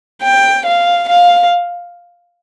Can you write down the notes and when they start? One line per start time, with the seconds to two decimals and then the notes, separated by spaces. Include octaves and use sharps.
0.23 G5
0.65 F5
1.08 F5